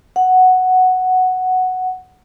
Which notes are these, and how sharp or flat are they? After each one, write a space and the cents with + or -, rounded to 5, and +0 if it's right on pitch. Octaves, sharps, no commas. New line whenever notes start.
F#5 +0